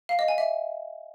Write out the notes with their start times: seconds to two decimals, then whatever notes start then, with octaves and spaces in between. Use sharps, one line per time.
0.09 F5
0.19 D#5
0.28 G#5
0.38 E5